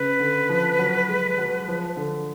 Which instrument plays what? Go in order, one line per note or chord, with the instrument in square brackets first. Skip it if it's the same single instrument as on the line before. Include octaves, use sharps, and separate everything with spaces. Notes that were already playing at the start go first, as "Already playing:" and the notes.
Already playing: [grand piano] C#3 [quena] B4
[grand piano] D3
F3
F#3
G#3
F#3
F3
D3